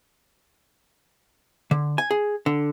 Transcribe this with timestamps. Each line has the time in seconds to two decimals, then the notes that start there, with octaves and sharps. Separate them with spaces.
1.71 D3
1.98 G#5
2.11 G#4
2.46 D3